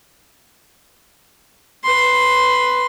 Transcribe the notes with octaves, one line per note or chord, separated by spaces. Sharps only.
B4 C6